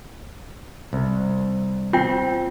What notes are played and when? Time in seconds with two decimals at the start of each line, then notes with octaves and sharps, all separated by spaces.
0.93 C2
1.93 C4 F4 G5